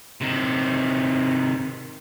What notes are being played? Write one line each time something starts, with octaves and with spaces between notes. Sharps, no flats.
C3 D#3